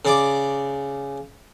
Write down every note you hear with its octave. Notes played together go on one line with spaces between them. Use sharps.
C#3 D5 D6